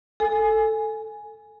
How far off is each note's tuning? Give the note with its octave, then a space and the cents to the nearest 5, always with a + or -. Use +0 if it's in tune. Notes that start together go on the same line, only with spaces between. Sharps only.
A4 +0 G#5 +0